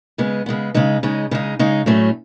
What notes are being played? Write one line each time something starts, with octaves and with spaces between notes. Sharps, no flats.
C#3 G#3 B3
C#3 G#3 B3
C#3 G#3 D#4
C#3 G#3 D#4
C#3 G#3 D#4
C#3 G#3 D#4
A2 F#3 A3 C#4